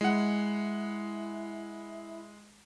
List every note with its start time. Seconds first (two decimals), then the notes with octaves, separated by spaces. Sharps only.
0.01 G#3 E4 F#5